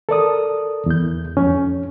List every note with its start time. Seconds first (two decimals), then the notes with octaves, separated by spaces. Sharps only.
0.09 A4 A#4 D5 D#6
0.86 E2 G6
1.37 F2 C#4